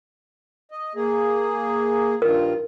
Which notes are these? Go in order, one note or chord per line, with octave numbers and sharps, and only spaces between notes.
D#5
A#3 G#4
G2 D#3 F4 A#4